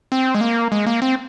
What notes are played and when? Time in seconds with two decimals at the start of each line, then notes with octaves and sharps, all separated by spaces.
0.12 C4
0.35 G#3
0.41 A#3
0.72 G#3
0.86 A#3
1.02 C4